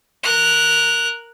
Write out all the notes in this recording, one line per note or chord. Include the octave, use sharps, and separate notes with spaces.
A#4 F#6